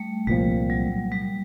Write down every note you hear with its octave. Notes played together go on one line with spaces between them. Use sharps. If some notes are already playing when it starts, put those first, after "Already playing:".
Already playing: G3 A3
C2 A#2 F3 G3
F#3
G3